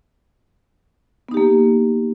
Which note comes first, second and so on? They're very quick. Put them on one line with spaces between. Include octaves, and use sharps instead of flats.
B3 D#4 G4 A#3